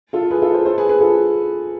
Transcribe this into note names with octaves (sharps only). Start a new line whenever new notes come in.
F4 A4
G#4 B4
F4 A4
A4 C5
A4 C5
G#4 B4
G#4 B4
F4 A4